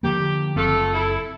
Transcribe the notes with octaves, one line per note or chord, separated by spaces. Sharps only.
D3 F3 A#3 G4
F#1 A3 C4 F4 A4
E4 A4